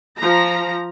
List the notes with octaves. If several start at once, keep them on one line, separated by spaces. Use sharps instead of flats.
F3 A#5